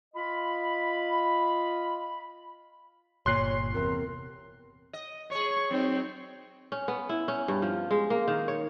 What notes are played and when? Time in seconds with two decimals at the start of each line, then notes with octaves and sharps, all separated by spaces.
0.14 F4 D#5 B5
3.26 G1 A#2 C#5 C6 F#6 C7
3.74 E2 C3 A#4
4.93 D#5
5.31 G#4 C#5 C#6
5.71 F#3 C4 D#4
6.72 C#4
6.88 B3
7.09 E4
7.28 C#4
7.48 G2
7.62 F3
7.91 G#3
8.10 A#3
8.28 D#3
8.48 C#5